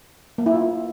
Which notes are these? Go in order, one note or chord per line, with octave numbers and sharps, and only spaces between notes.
A#3
E4
F4